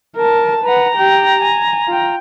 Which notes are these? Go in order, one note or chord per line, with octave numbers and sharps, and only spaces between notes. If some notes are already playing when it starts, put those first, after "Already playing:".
A#4 A5
B4 F#5 A#5
G4 G5
G#5
F4 G5